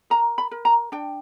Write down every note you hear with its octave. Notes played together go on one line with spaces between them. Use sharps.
A#4 A#5
B5
A#4
A#5
D4 G5